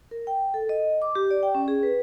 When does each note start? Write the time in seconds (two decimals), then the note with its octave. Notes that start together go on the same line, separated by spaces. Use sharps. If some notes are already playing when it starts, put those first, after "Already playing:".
0.11 A#4
0.27 G5
0.54 A4
0.69 D#5
1.02 D6
1.15 G4
1.31 D5
1.43 G5
1.55 C#4
1.68 G#4
1.83 B4